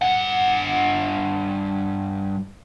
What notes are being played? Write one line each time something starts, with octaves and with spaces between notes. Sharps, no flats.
G2 F#5